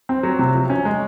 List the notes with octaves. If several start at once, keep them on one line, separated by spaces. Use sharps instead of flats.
C4
F#3
C3
F3
C#4
G#3